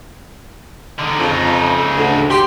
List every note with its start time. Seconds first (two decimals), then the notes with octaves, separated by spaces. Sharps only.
0.99 D3 D#4
1.19 F2 C#3 D#4
1.96 D2
2.31 G4 C6